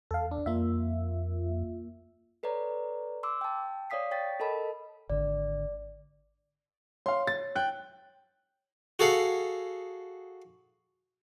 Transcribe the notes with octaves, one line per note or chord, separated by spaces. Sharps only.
E2 A4 F5
D4
F2 A#3 F4 E5
A4 B4 C#5 D5 A#5
C6 D6 E6
G5 A5
C#5 D5 F5 D#6 B6 C7
C#5 G5 A6 B6
A4 A#4 D#5 A5 B5
G#1 D3 D5
C#5 F5 C6
A6
G5 F#6
F#4 G#4 A4 F5 F#5